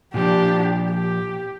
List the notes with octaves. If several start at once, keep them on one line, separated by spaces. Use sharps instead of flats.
A#2 F3 D4 G4
G4